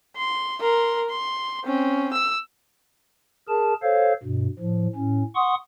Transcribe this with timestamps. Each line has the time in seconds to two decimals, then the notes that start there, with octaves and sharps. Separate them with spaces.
0.17 C6
0.61 A#4 C6
1.09 C6
1.65 C4 C#4
2.13 E6
3.48 G#4 A#4 A5
3.83 A4 C5 C#5 F5
4.23 G2 B2
4.59 A2 F3
4.96 A2 C#4
5.35 F#5 C6 C#6 D#6